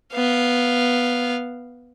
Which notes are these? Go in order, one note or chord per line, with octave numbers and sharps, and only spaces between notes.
B3 F5